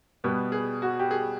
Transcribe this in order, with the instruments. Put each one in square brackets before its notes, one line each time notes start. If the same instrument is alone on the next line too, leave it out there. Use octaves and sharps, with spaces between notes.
[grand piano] B2 G3 B3
G#4
F#4
G4
G#4